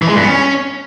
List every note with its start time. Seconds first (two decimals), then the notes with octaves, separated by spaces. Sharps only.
0.02 E3
0.08 G#3
0.15 G2
0.22 B3
0.29 C#4